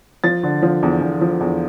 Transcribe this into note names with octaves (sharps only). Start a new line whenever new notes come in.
F3 A6
D3
F3
E2
E2
F3
E2